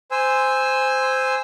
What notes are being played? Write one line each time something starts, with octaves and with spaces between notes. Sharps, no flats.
C5 G#5 E6